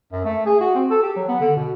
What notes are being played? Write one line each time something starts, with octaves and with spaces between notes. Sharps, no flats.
F#2
A3
G#4
F#4
C4
A4
G4
F#3
B3
D3
B2